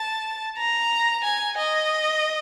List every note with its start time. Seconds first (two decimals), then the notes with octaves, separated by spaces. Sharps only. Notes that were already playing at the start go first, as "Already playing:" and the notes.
Already playing: A5
0.58 A#5
1.24 G#5
1.58 D#5